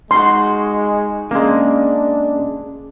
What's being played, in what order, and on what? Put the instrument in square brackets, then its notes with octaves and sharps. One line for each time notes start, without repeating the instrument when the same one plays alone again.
[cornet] G#3 [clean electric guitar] D#4 F#4 [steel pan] C6
[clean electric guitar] C#3 [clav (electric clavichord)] G#3 A#3 [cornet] D4